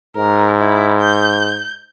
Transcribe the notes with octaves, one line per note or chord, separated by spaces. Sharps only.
G#2 A#4
E4
G6